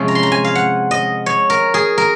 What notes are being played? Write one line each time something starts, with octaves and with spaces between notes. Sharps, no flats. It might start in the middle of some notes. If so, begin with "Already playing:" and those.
Already playing: C3 F3 G#3 C#4
A#5
C6
A#5
G#5
F5
F#5
D#5
C#5
A#4
G#4
A#4